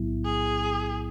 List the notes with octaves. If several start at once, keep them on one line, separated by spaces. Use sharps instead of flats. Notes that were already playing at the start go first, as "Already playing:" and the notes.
Already playing: B1 A2 F#3 B3 E4
G#4